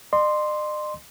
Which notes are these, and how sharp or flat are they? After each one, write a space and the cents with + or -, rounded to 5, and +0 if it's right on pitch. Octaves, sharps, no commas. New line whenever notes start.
D#5 -45 C6 +0